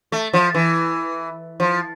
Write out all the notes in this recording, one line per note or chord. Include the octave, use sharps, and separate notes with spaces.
A3
F3
E3
F3